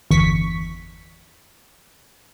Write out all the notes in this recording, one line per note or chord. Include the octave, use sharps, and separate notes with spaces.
G1 E2 C#6 B6